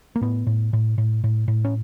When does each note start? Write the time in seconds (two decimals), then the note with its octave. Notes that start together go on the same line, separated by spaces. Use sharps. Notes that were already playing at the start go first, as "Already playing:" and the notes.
0.16 A#3
0.21 A2 B3
0.47 A2
0.73 A2
0.98 A2
1.24 A2
1.48 A2
1.65 C#4